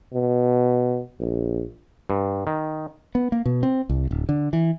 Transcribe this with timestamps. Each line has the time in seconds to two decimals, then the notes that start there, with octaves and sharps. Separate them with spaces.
0.13 B2
1.20 A#1
2.10 G2
2.47 D#3
3.15 B3
3.32 A#3
3.46 B2
3.63 C4
3.89 C2
4.11 D1
4.29 D3
4.53 E3